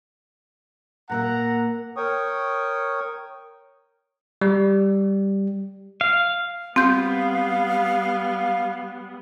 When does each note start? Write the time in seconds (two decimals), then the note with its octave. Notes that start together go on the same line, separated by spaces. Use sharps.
1.09 A#2 A#3 E5 F#5 A#5
1.96 A#4 C#5 G5 C#6 D#6
4.41 G3
6.01 F5
6.76 G3 B3 C4 F5 G6